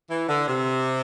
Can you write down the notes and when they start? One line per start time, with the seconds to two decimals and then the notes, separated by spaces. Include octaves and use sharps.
0.10 E3
0.29 D3
0.48 C3